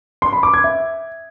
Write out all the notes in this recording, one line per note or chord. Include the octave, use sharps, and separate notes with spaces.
C6
B5
D6
G#6
E5